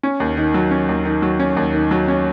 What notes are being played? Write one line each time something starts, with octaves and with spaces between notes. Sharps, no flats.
C#4
D#2
D#3
F#3
C#4
D#2
D#3
F#3
C#4
D#2
D#3
F#3
C#4